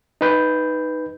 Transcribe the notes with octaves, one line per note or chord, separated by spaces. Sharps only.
D#4 B4 G6